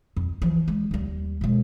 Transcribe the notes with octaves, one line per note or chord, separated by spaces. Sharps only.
F2
E3 F3
G#3
D#2 G3
B2 G#3